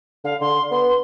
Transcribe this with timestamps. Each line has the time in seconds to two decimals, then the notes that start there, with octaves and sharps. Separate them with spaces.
0.24 D3 F5
0.41 D3 C6
0.71 B3 C6